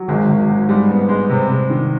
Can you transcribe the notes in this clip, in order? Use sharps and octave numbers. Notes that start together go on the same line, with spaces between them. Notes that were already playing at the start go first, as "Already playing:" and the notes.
Already playing: F#3
G#1 G#3
G#1
G#2
G3 G#3
B3
G#3
C3
C3
D#3